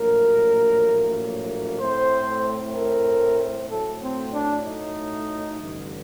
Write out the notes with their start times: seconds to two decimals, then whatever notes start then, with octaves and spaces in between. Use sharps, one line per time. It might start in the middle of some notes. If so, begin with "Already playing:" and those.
Already playing: A#1 A2 F#3 A#3 A#4
1.80 A2 A3 C4 C5
2.75 A#4
3.70 A2 F#3 A3 C4 A4
4.01 C4
4.32 D4
4.65 D#4
5.59 A1 G2 D3